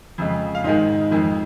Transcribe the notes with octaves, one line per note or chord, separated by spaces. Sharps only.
F2 C#3 G#3
F5
G#2 D#3 G#3 D#5
F2 D#3 G#3